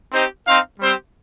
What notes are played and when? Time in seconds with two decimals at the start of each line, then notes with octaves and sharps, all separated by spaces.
0.12 C4 D#4 G4 C5
0.47 C4 D#4 C5 F5
0.80 G3 C4 G4 C5